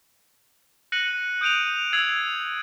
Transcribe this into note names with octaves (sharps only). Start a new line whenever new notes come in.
F#6 A#6 C#7 D#7 F#7
D#6 G6 D7 D#7 F7
E6 G#6 C7 F7 F#7